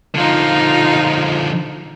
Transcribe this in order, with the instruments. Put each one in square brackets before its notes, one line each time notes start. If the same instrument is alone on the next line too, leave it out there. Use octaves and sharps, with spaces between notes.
[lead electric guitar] D3 F3 [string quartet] D#4 F4